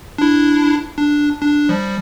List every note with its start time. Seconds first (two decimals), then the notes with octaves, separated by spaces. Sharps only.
0.18 D4 E4
0.98 D4
1.42 D4
1.69 F3 G3